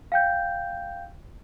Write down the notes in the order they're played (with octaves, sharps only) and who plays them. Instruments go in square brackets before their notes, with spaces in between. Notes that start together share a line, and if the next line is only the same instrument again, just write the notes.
[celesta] F5 G5 G6